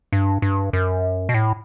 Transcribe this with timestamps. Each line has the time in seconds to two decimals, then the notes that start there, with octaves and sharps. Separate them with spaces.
0.12 G2
0.42 G2
0.73 F#2
1.29 B2
1.34 A2